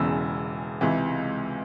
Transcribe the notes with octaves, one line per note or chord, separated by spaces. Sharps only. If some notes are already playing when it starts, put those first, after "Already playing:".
Already playing: E1 E2 C#3 E3 E6
C#2 C3 E3